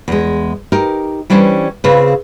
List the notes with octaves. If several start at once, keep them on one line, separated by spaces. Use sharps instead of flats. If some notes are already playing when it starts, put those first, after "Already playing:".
E2 G#3
D#4 G4 A#4
E3 G3 C#4 D4 C5
C#3 C4 F4 G#4 B4